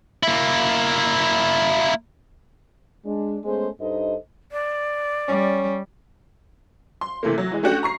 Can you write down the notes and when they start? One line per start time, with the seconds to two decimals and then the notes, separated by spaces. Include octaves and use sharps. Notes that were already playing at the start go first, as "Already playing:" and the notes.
0.23 A#3 E4
3.05 G#3 D4
3.45 G#3 A3 B3 C#4 G#4 C5
3.80 G2 D#4 A4 C5 D#5
4.52 D5
5.28 G3 C#4
7.01 C6
7.23 C3 E3 A3 A#3
7.38 F#3
7.51 E3 G#3
7.63 A3 C#4 D4 F#4 G4
7.83 A#5 C#6 C7